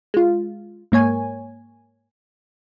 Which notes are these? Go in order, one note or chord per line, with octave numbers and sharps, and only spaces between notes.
G#3 F4
G#2 A#3 C#5 G#5